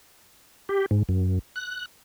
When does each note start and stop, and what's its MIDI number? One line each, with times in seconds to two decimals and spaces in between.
0.69 0.86 67
0.91 1.03 44
1.09 1.39 42
1.56 1.85 90